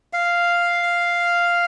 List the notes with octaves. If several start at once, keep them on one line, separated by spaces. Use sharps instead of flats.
F5